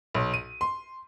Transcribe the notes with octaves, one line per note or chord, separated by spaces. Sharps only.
B1
D#7
C6